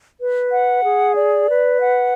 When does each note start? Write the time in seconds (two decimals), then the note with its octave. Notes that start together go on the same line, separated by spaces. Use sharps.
0.21 B4
0.52 F#5
0.83 G#4
1.15 D5
1.47 B4
1.79 F#5